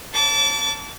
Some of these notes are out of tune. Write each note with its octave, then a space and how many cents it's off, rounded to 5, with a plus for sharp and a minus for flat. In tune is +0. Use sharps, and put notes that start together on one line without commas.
A5 +0 D6 -35